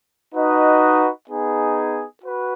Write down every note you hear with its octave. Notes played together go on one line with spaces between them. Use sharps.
D#4 F#4 B4 D#5
B3 D#4 G#4
F#4 B4